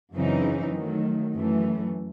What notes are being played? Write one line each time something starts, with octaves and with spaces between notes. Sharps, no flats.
F#2 C#3 E3 C4 D#4
D#3 F#3 A3
F#2 E3 A3